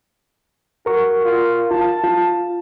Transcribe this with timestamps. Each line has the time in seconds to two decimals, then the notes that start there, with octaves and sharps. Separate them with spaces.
0.86 F#4 A#4 C#6
1.24 F4
1.71 F4 A5
2.04 F4